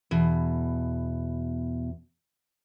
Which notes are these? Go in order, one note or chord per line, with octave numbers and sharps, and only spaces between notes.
E2 B2